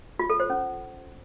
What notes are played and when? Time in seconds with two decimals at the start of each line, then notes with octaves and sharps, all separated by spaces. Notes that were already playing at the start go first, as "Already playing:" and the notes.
0.19 F4
0.30 A4
0.40 C5
0.50 C#4